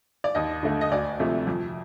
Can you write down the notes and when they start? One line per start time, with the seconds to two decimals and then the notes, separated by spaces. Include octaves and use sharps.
0.24 D5
0.35 D#2 D#5
0.63 D3 A3
0.81 D#5
0.92 D2 D5
1.20 C3 F3 A3
1.47 F2